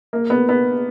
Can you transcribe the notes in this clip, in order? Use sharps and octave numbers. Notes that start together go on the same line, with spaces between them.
A#3
B3
B3